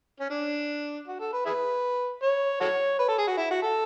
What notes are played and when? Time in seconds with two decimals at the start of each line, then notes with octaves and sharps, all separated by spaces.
0.20 C#4
0.30 D4
1.07 F#4
1.20 A4
1.33 B4
1.45 E4 G#4 B4
2.23 C#5
2.61 F#4 A4 C#5
2.99 B4
3.08 A4
3.18 G#4
3.27 F#4
3.37 E4
3.51 F#4
3.63 A4